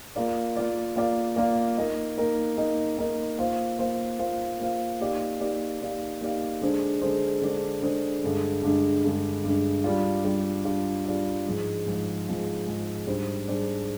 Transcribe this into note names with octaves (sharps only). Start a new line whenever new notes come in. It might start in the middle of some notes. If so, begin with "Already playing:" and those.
A#3 F4 A#4 D5 F5
A#3 F4 A#4 D5 F5
A#3 F4 A#4 D5 F5
A#3 F4 A#4 D5 F5
A#3 D#4 A#4 D#5
A#3 D#4 A#4 D#5
A#3 D#4 A#4 D#5
A#3 D#4 A#4 D#5
A#3 F4 C5 F5
A#3 F4 C5 F5
A#3 F4 C5 F5
A#3 F4 C5 F5
A#3 D#4 G4 D5 F5
A#3 D#4 G4 D5 F5
A#3 D#4 G4 D5 F5
A#3 D#4 G4 D5 F5
D3 G#3 D4 G#4 C5
D3 G#3 D4 G#4 C5
D3 G#3 D4 G#4 C5
D3 G#3 D4 G#4 C5
G2 D3 G#3
G2 D3 G#3
G2 D3 G#3
G2 D3 G#3
G3 D4 F4
G3 D4 F4
G3 D4 F4
G3 D4 F4
G#2 F3 G#3
G#2 F3 G#3
G#2 F3 G#3
G#2 F3 G#3
G#2 G3 D4 G#4 C5
G#2 G3 D4 G#4 C5